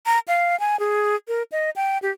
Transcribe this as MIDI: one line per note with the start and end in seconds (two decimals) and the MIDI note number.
0.06 0.19 82
0.28 0.59 77
0.60 0.79 80
0.79 1.16 68
1.28 1.43 70
1.52 1.70 75
1.76 1.98 79
2.02 2.11 67